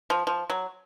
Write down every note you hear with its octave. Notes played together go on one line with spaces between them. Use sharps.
F3
F3
F#3